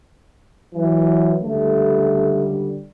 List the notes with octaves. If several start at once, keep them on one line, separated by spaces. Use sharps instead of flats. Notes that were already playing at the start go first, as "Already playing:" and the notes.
E3 F#3
C#2 D3 G3 A3